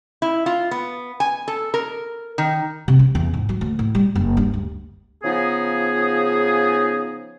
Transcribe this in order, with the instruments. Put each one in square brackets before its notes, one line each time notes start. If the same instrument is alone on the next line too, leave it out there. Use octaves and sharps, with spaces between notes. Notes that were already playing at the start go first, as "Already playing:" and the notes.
[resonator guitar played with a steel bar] E4
F4
B3
G#5
A4
A#4
D#3
[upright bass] C3
C#4
E2
G#2
F#3
D2
A2
G3
F#1
G2
D2
[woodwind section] C#3 F3 B3 D#4 G#4